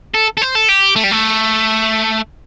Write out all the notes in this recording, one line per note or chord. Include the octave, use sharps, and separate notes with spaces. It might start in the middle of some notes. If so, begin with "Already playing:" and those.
A4
A4
C5
A4
G4
A3
G3
A3